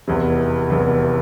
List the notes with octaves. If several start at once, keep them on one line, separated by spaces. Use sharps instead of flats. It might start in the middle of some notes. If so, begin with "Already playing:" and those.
F1 E2 C3
F1 E2 C3